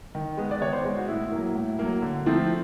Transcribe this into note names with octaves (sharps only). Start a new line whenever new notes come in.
D#3
G#3 B3
D5
D#3 C#5
C5
G#3 B3
F#4
A2 E4
F#3 A#3
A2
F#3 A#3
D3
F3 A3 C4